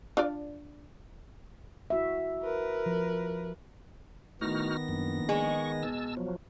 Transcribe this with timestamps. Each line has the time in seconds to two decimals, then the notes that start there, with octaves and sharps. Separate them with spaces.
0.17 D4 F4 D5
1.90 E4 F#4 E5
2.42 A#4 B4
2.86 F3
4.41 A2 D#3 B3 D#4 F#4 F6 A#6
4.88 A#1 F#2
5.29 G#3 C#6
5.83 B2 A5 E6
6.17 F3 F#3